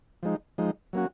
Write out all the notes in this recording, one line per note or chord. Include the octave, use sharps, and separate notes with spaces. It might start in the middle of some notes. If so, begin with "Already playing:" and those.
F3 G#3 D#4
F3 G#3 D#4
F#3 A#3 C#4 F#4